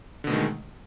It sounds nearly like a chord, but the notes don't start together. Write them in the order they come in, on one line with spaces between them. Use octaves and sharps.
D3 B2 A3 D#3 G#3